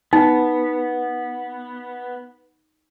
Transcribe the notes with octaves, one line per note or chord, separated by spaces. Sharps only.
B3 D#4